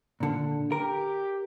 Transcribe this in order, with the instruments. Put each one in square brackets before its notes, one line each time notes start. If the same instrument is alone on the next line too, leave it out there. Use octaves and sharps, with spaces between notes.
[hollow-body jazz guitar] A#2 D3
[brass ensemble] G4 [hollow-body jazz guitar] A#4